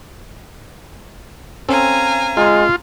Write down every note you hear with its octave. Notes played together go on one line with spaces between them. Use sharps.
C4 C#4 A4 F5 G#5 A#5
G#3 F4